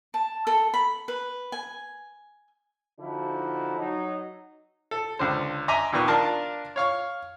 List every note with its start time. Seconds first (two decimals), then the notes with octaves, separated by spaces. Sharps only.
0.14 A5
0.47 A4
0.74 B5
1.08 B4
1.52 G#5
3.00 D3 F3 D#4 E4 F#4
3.78 F#3 D#4
4.91 A4
5.19 C#2 D3 C5
5.68 D#5 E5 G#5 A#5 C6 D6
5.92 D#2 A#2 D#3 B3 C#6
6.08 D4 F4 A#4 A5
6.76 C#5 F5 C#6